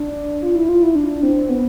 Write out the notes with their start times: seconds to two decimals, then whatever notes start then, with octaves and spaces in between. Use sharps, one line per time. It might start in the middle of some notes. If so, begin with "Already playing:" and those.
Already playing: D4
0.42 F4
0.56 E4
0.69 F4
0.82 E4
0.95 D4
1.23 C4
1.49 B3